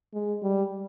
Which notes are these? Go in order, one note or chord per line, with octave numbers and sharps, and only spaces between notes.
G#3
G3